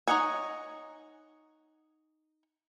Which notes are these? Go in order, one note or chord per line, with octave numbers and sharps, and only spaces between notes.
D#4 C#5 D#5 F#5 G#5